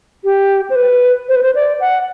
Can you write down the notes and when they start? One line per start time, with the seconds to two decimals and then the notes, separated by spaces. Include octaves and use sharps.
0.24 G4
0.70 C5
0.75 B4
1.29 C5
1.36 B4
1.43 C5
1.55 D5
1.80 F#5